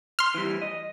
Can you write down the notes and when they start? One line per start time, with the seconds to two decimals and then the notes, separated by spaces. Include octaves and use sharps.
0.19 C6 F6
0.34 E3 G3
0.62 D#5